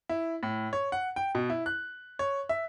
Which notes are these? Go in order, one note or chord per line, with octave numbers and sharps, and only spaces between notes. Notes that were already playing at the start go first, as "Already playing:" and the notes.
E4
A2
C#5
F#5
G5
B2
E4
F#6
C#5
E5